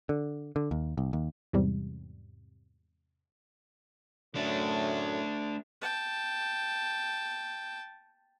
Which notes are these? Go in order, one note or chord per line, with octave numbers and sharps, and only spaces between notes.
D3
D3
D#2
C2
D#2
E2 G#2 C3 G3
F#2 A2 A3 D4
G5 A5